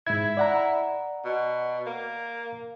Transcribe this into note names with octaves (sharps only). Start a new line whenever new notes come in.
G#2 E4 G#6
D5 F#5 A#5
B2
A#3